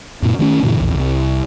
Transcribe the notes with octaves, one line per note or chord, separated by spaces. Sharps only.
F#2 A#2
D#3 A3 A#3 C#4
F#2 A#2 D3 E3
A#1 E2
C2